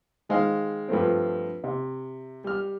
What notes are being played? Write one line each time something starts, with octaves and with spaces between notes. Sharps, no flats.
D#3 G#3 C5 F5 F6
G2 F3 A3 C4
C3
G3 F6